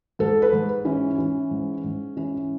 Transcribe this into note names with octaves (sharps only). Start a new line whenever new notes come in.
G#2 A4
B4
G#2
E3 C#4
E3
G#2
G#2
E3 C#4